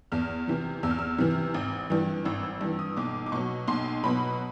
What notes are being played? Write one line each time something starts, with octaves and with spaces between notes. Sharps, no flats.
E2 F6
C3 E3
E2 E6
F6
E6
C3 E3
G#1
G2 E3
G#1 E6
E6
G2 E3
D#6
B1 D6
D6
B2 F#3 C#6
B1 C6
B2 F#3 B5